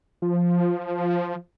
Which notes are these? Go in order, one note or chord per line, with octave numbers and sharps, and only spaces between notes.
F3